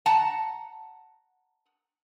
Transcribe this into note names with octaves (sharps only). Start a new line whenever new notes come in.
F#5 A5 A#5